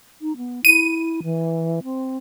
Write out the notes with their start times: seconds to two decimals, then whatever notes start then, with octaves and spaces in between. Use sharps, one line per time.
0.21 D#4
0.37 B3
0.65 E4 D#7
1.23 E3
1.84 C4